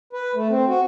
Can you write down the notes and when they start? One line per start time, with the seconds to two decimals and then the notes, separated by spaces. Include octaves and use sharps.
0.13 B4
0.35 A3
0.50 C4
0.68 F#4